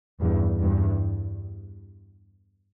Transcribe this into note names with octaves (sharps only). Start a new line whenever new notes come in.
E2 G2
E2 G2